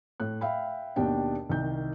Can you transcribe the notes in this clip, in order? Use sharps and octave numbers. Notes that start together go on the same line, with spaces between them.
A2 F#6
E5 F5 G5 B5
D#2 B2 D4 G4 G5
C2 D#3 G6